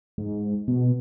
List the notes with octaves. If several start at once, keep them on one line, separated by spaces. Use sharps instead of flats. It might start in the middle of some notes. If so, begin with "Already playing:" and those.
G#2
B2